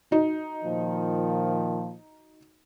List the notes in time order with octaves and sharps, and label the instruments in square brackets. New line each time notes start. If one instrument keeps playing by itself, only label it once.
[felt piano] D#4 F#4
[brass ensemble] A#2 D#3 F3